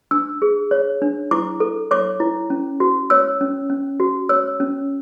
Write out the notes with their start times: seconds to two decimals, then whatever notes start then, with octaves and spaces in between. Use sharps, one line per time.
0.11 D4 E6
0.42 G#4
0.71 C#5
1.02 D4
1.31 E4 D6
1.60 A4
1.91 C#5 D6
2.20 E4
2.50 C#4
2.80 F#4
3.10 C#5 E6
3.41 C#4
3.70 C#4
4.00 F#4
4.29 C#5 E6
4.60 C#4